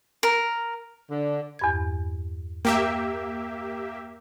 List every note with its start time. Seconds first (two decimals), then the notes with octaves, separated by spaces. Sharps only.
0.23 A#4
1.10 D3
1.59 E2 G2 G#6
2.65 A#3 G4 E5 G5 A#5